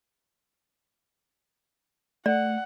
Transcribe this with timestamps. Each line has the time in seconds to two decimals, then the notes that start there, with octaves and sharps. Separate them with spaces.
2.26 A3 D5 F#5